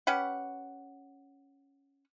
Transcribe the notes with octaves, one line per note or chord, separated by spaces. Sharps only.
C#4 G4 B4 F#5